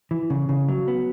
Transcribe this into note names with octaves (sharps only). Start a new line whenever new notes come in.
E3
C#3
C#3
F#3
B3